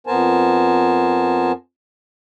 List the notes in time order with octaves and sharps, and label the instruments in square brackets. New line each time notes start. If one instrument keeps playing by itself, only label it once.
[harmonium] F2 B3 A#4 C5 G#5 A5